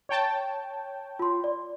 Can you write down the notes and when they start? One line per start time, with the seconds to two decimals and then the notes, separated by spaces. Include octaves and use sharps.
0.09 C#5 G5 A5
1.19 F4 C6
1.44 D5